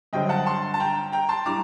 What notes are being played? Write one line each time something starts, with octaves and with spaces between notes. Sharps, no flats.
G2 D3 F#3 C4 D#5 G5
F#5 A5
A5 C6
A5
G5 A#5
G5 A#5
A5 C6
A2 G3 D4 A#5 D6